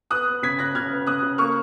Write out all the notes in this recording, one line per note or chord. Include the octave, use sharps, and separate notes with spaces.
B3 D#6 F#6
B3
C#3 G#6 B6
C#3 F#6 A#6
C#3 F6 G#6
B3
C#3 D#6 F#6
C#3
A#3 C#6 F6